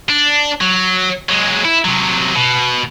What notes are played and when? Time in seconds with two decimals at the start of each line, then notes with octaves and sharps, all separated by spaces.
0.09 D4
0.61 F#3
1.29 F#3 G#3
1.65 E4
1.85 C3 F#3
2.36 B2